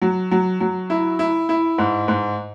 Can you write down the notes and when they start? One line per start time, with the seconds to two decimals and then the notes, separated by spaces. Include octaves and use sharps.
0.02 F#3
0.31 F#3
0.60 F#3
0.90 E4
1.19 E4
1.49 E4
1.78 G#2
2.08 G#2